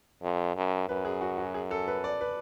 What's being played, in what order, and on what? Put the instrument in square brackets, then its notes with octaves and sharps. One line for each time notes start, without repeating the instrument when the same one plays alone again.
[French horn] F2
F#2
[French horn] F#2 [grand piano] B4
[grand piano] G#4
F#4
F#4
G#4
A4
B4
D5
B4